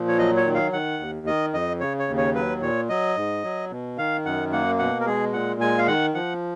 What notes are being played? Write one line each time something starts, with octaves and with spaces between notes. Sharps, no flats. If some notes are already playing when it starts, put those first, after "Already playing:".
Already playing: A#2 F3
C#5
F#3 D#5
C#5
D#3
F5
D#3 F#5
D#2
D#3 D#5
F2 D#5
C#3 C#5
C#5
D#2
C#5
F#3 B4
A#2 C#5
F#3 D#5
G#2
F#3
B2
D#3 F5
F#2 F#5
A#3 F#5
B2 F#5
A#4
G#3 G#4
A#2 F#5
G#3 G#5
F5
D#3 F#5
F3 F#5